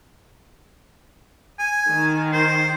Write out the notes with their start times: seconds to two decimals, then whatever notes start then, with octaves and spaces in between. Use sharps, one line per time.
1.59 G#5
1.89 D#3
2.33 C5